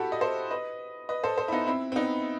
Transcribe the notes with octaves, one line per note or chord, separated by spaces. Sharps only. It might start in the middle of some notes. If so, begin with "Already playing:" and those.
Already playing: E4 F#4 G4 A4
D#5
A4 C5
B4 D#5
B4 D#5
A4 C5
A4 C5
E4
B3 D#4
C4 E4
C4
B3 D#4